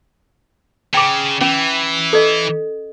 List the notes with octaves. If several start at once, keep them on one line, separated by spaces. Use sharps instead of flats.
C#3 G5 D6
E3 C#4
A4 D#5